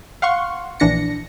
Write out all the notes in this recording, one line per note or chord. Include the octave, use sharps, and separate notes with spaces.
F5 F#5 C6 C#6
A#1 E3 D4 A#6 C#7